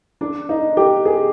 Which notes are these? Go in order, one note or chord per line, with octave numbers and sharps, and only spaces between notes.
D4
D#4
G4
G#4